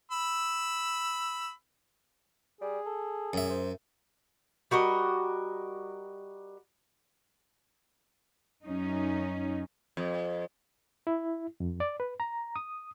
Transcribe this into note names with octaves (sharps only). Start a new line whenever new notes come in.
B5 E6
G3 G#4
A4
F#2 F#3 E5
C5
G3 F#4 A#4 D#5
F#2 C#4 D#4
F2
E4
F2
D5
B4
A#5
D#6